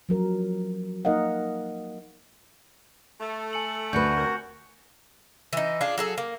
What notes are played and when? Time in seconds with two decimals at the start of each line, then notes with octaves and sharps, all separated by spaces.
0.09 F3 F#3 A#4
1.05 A#3 D#4 A#4 D#5 F5 F#5
3.20 A3 A4
3.53 G#5 C#7 F#7
3.93 D2 F#4 B4 G6 C#7
4.16 C3 A#4
5.53 E3 D#4
5.81 D4 F4 G#4
5.98 F#3 G#4 A4
6.18 A#3